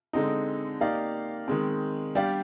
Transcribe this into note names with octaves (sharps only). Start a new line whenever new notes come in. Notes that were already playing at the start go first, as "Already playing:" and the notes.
D3 G#3 C4 D#4
A#3 D#4 G4 D5 F5
D#3 G#3 C4
G3 D4 G4 D5 F5